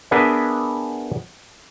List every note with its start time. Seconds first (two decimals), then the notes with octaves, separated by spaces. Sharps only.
0.11 B3 D4 G#4 A#4 B4 E5